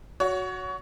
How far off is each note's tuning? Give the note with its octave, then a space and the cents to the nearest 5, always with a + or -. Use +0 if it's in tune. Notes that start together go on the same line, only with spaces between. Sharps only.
F#4 -5 C#5 +25